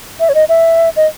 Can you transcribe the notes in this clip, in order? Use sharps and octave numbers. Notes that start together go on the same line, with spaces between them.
E5
C#5
D#5
E5
D#5